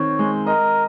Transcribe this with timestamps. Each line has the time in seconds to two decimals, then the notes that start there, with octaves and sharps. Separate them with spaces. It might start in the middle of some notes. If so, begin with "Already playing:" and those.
Already playing: D#3 C4 C#5
0.19 G#3
0.46 A#4 D#5